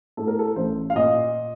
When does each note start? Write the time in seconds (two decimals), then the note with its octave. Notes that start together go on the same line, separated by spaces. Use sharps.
0.17 A2 A4
0.27 A#4
0.39 A4
0.56 A1 C5
0.90 F5
0.95 A#2 D#5